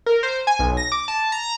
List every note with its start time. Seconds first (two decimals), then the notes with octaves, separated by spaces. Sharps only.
0.06 A#4
0.23 C5
0.47 G#5
0.59 B1
0.77 A#6
0.92 D6
1.08 A5
1.32 A#5